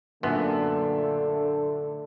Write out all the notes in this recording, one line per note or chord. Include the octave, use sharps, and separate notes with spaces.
F#2 A#2 D3 A3 B3 E5 C6